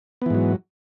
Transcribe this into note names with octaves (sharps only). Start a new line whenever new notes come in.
G#2 E3 F#3 B3